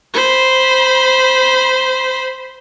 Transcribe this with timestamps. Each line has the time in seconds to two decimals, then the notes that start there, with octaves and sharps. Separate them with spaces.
0.13 C5 B5